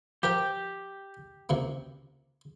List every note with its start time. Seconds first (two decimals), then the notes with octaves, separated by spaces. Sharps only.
0.23 F3 G4 A#4 G5
1.49 C#2 C3 A#3